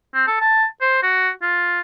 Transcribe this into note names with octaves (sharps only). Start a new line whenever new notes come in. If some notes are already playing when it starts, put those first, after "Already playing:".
C4
A4
A5
C5
F#4
F4